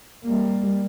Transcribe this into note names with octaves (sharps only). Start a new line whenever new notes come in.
G3 A#3